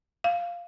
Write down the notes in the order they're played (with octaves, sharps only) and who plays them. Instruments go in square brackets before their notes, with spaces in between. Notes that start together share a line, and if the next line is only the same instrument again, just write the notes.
[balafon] F5